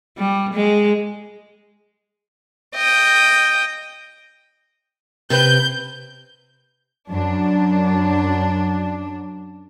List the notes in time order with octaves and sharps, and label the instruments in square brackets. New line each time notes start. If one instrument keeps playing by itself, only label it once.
[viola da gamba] G3
G#3
[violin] D#5 G5
[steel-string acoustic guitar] C3 C4 B4 [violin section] G6
[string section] F#2 D4